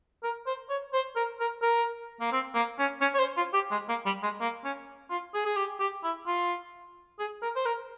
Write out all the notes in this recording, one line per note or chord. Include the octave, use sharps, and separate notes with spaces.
A#4
C5
C#5
C5
A#4
A#4
A#4
A#3
C4
A#3
C#4
C#4
C#5
C5
F4
G4
G#3
A#3
G3
G#3
A#3
C#4
F4
G#4
G#4
G4
G4
E4
F4
G#4
A#4
C5
A#4